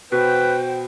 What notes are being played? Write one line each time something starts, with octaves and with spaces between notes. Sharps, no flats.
B2 B4 C5 G5